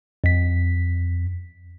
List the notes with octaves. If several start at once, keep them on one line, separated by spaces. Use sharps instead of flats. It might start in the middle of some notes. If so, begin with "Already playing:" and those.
F2 B6